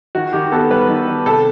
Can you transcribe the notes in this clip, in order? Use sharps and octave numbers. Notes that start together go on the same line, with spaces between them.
D#3 F#4
D#3 G4
B3 A4
G3 B4
D#3
D#3
C3 A4